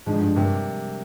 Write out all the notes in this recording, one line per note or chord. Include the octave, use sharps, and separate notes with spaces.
G#2 D3 F3 G#3
G2
G2 C3 G3 A#3